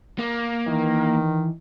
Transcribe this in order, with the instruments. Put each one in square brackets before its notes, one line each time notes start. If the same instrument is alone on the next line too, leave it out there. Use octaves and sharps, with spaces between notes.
[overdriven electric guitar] A#3
[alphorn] D#3 [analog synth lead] E3